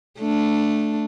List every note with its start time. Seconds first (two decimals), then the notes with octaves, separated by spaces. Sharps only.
0.19 A3 D4